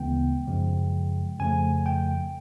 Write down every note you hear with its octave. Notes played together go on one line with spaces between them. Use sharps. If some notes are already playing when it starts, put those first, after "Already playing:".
Already playing: D2 C#3 E3 G#3 B3 G5
F#2 C#3 F3 G#3
F2 C#3 F3 A3 G#5
G5